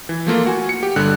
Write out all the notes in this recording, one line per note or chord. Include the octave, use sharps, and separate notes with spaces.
E3
F3 A3 A#3 F4
F#4 G#5
C#7
G4
G1 D3 G3 F#6